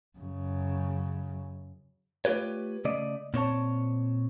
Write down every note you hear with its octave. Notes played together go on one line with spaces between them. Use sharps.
F#2 C#3
A3 F4 G4 B4 C#5
C#3 A3 D5 D#5
A#2 C4 C#5 A5